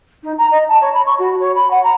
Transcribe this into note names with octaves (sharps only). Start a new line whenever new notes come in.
D#4
A#5
D#5
A5
C#5
B5
C#6
F#4
C#5
B5
F#5
A#5